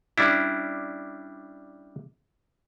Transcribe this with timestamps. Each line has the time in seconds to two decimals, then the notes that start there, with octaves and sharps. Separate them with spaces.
0.18 G3 C#4 D4 E4